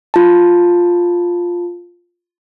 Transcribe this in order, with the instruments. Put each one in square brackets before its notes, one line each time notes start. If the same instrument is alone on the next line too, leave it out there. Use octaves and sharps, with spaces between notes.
[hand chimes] F4 A5